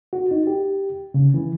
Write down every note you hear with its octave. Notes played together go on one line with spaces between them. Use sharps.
F#4
D#4
G4
C#3
E3